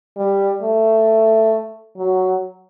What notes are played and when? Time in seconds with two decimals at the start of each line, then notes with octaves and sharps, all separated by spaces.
0.17 G3
0.62 A3
1.97 F#3